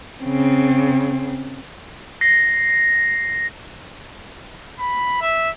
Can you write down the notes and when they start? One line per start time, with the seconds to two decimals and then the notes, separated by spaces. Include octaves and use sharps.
0.24 C#3 C4
2.21 A#6 C7
4.79 B5
5.21 E5